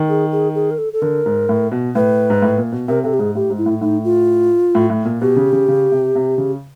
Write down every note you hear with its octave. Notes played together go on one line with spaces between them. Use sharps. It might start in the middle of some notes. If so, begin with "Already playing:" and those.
Already playing: D#3
G#4
G#4
G#4
A#4
A4
A4
D3 A#4
G#2
A2
B2
A2 B4
G#2
A2
A#2
B2
C3 A#4
C3 A4
G4
G#2 G#4
A2 G4
G#2
E4
A2
A2 D#4
F4
A2
A2
A#2
B2 G4
C#3
C#3
C#3
C3
C3
C#3